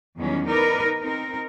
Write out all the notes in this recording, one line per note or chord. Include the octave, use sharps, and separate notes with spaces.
E2 D#3 F#3 G3 C#4
D#4 A#4 B4 D5
C4 D#4 A#4